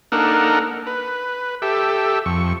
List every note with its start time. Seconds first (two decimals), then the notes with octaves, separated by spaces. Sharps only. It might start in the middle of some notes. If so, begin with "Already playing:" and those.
0.12 A#3 D4 D#4 A4 A#4 F#5
0.87 B4
1.62 G4 A4 E5
2.26 F2 C#6